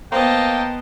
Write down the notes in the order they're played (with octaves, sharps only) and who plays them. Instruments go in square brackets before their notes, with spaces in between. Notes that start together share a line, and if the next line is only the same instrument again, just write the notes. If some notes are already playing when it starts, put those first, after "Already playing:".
[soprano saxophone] A#3 [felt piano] B3 A#4 C5 [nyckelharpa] D#5 A5 [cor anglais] G5